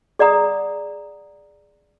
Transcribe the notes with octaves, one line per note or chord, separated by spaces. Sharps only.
G#4 D5 F#5 A#5 D#6